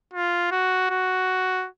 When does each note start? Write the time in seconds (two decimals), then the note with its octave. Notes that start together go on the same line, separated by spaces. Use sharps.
0.14 F4
0.51 F#4
0.90 F#4